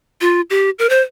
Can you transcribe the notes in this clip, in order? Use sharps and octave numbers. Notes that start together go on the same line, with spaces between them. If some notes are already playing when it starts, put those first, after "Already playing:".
F4
G4
A#4
C5